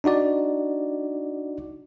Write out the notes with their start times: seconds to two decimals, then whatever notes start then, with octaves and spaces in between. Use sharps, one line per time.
0.04 D4 D#4 F#4 D5